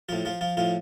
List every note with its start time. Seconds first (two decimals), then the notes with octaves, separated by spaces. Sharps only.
0.09 A2 F3 F4
0.25 F3 F4
0.41 F3 F4
0.57 A2 F3 F4